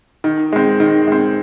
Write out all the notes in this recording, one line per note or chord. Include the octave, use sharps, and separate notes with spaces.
D#3
G#3 C4
D#3
G#3 C4